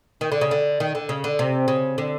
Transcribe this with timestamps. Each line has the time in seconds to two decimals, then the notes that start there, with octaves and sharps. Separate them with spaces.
0.21 D#3
0.32 D3
0.41 C#3
0.51 D3
0.80 D#3
0.95 D3
1.09 C#3
1.24 D3
1.39 C3
1.68 C#3
1.98 D3